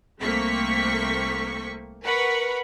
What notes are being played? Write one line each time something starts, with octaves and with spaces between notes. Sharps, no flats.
C2 A3 A#3 C4 C#6 B6
A#4 B4 F#5 B5 C#6